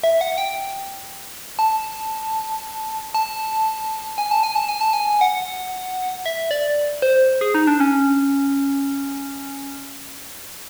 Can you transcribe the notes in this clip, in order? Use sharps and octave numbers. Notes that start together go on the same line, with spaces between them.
E5
F#5
G5
A5
A5
G#5
A5
G#5
A5
G#5
A5
G#5
F#5
E5
D5
C5
G#4
D#4
D4
C#4